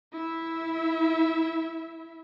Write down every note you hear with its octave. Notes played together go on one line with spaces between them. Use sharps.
E4 E5